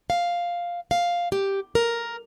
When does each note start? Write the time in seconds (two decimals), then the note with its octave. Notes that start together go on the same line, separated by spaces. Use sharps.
0.10 F5
0.91 F5
1.32 G4
1.75 A#4